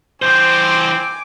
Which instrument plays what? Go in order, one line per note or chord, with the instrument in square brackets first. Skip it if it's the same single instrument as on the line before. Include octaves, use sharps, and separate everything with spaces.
[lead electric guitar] E3 C5 [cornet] C4 [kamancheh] G#5 D6 [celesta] G6